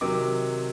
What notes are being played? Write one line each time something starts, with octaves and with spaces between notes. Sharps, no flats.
C3 D#3 F#3 D6